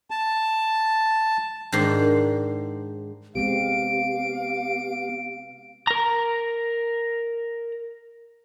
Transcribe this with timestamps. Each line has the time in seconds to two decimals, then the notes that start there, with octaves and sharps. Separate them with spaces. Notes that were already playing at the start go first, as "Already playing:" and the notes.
0.10 A5
1.72 G#2 D#3 D4 C5
3.35 C3 G#3 B3 C4 G4 F5 D7
5.87 A#4 A#5